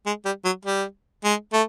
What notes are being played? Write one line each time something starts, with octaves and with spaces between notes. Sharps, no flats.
G#3
G3
F#3
G3
G#3
A3